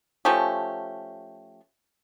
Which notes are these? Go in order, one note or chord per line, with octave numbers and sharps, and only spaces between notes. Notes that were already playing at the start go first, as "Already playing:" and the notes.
F3 A3 C#4 G4